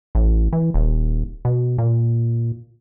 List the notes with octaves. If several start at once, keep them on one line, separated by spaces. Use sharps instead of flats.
A1
E3
D#1
B2
A#2